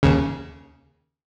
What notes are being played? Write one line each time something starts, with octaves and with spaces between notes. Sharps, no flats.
D#2 C#3